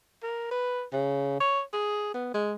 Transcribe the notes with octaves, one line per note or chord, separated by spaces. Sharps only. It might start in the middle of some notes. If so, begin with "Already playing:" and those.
A#4
B4
C#3
C#5
G#4
B3
G#3